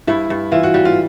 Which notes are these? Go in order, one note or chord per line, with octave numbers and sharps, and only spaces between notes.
G2 E4
G2
E3 F4
F#4
G3 F#4
F4